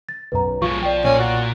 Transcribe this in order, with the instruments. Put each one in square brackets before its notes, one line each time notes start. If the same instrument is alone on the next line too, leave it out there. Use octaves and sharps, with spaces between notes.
[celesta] A6
[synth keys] B1 F#2 [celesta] B4 A#5
[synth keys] B1 F4 [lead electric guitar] F3 G#3 [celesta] C#6
[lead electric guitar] F3 [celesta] D5 G5
[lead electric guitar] A#2 [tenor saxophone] C#4
[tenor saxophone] F#4